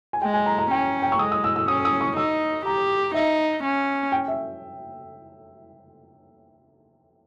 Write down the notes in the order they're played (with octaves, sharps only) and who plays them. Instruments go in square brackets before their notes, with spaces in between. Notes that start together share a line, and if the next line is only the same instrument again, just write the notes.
[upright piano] G#5
[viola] G#3 [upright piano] G5
[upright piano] G#5
A#5
A#5
[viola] C#4 [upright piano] G5
[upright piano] G5
C#6
[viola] G#3 [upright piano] D#6
[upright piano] D#6
E6
E6
[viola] C#4 [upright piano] D#6
[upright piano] D#6
C#6
[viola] D#4 [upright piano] E6
[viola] G4 [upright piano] A#5
[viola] D#4 [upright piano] E5
[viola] C#4
[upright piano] G5
E5